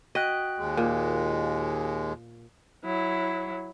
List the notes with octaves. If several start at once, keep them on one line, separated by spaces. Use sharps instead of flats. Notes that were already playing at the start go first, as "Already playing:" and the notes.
F#4 D#5 G5 F#6
D#2 G#3
A#2
F#3 E4